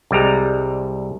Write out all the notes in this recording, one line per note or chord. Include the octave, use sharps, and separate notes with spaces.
C2 G3 G#3 A#5